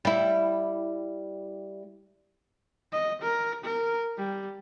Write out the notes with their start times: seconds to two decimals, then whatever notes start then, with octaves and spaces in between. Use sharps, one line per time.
0.05 G3 E4
2.92 D#5
3.22 A#4
3.64 A#4
4.17 G3